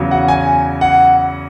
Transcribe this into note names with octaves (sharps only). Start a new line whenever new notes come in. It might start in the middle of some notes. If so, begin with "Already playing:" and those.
Already playing: E2 C#3 F#3
F#5
G#5
F#5